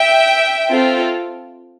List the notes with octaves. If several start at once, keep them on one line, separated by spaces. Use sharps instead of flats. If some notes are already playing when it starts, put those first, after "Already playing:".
Already playing: E5 G5
C4 F4 A4